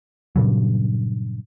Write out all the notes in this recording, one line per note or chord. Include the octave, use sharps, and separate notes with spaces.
G2 A#2 C#3 F#3